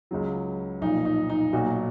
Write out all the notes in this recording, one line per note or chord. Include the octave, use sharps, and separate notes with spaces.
C#2 C#3 F#3
B1 A#2 F3 D#4
D#4
D#4
B1 A#2 F#3 F#4